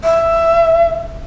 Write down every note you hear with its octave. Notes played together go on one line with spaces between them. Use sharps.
E5